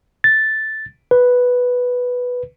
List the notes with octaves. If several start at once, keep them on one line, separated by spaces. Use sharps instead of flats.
A6
B4